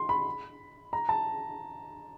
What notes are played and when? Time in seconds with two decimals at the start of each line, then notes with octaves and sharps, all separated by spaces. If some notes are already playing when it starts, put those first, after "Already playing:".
Already playing: C6
0.09 B5
0.93 A#5
1.09 A5